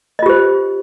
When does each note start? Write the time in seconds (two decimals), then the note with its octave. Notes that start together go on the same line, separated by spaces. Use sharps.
0.19 D#5
0.22 F4
0.26 G4
0.29 C5